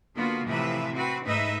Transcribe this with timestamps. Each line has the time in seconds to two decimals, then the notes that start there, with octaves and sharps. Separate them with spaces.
0.16 D3 A#3 B3 F4 F#4
0.46 A2 C3 E3 F3 B4 E5
0.93 C4 F#4 B4
1.25 G#2 A3 D#4 B4 D#5 E5